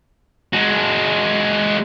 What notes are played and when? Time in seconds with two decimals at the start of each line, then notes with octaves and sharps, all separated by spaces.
0.53 G#3 F#4